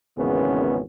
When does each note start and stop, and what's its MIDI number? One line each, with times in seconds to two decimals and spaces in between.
0.17 0.81 32
0.17 0.81 40
0.17 0.81 49
0.17 0.81 58
0.17 0.81 59
0.17 0.81 61